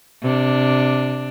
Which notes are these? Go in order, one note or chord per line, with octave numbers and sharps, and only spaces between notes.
C3 D4